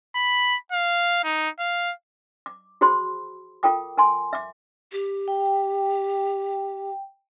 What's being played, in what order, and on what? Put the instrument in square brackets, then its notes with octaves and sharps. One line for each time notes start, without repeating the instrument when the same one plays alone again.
[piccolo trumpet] B5
F5
D#4
F5
[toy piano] D6
F#4 G#4 C5 B5 C6
F4 A4 A#4 G5 D6
A#4 G#5 C6
E5 D6
[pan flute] G4
[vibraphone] G5